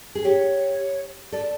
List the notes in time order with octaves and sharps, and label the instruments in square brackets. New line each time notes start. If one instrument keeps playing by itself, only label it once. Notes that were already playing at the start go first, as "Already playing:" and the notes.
[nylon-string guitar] G#4
[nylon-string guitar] G4 [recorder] C#5
[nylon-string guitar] A4 [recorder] D5